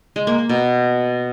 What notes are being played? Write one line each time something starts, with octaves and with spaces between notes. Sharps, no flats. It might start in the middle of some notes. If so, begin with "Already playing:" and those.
G#3
A#3
A#3
B2